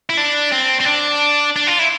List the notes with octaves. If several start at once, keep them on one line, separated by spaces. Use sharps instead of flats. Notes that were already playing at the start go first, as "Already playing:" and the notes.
E4
D4
C4
C4
D4
D4
F4
E4